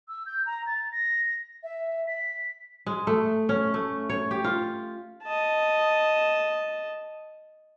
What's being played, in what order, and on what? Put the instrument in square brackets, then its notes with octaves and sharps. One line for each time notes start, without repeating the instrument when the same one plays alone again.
[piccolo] E6
G6
A#5
A6
A#6
E5
B6
[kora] G#3
A3
C#4
A3
C#5
G4
F4
[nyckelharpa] D#5 A5